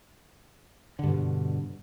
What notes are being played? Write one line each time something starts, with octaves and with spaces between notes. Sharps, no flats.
G2 B2 D3